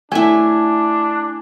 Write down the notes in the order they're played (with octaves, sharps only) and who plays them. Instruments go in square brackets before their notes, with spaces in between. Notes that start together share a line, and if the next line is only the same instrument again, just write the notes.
[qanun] A3 E4 [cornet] D4 [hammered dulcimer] G#5